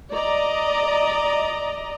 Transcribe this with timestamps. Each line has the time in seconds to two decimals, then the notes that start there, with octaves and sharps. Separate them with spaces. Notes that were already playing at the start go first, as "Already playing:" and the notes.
0.12 D5 D#5 A#5